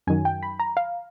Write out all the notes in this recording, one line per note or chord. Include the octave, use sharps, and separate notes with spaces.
F#2 D#3 F#3 G#5
G5
B5
A#5
F5